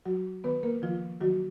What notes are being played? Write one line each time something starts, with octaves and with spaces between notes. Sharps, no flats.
F#3 F#4
D#3 B3 B4
A#3 A#4
D#3 F3 F4
D#3 F#3 F#4